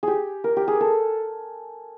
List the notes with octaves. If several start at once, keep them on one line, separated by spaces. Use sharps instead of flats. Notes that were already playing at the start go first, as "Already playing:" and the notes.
G4 G#4
A#4
G4
G#4
A4